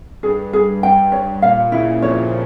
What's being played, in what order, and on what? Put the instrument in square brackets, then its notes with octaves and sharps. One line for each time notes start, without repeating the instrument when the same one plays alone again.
[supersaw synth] G2 [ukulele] G#4
[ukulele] G#4
[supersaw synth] G2 [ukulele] G5
[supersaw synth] G2 [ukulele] C#5
[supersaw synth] A#2 [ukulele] F5
[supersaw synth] C#3 [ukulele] E4
[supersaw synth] F2 F3 [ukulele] C#5